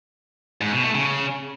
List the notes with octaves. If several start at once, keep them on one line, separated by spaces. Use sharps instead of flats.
G#2
B2
A3
C#3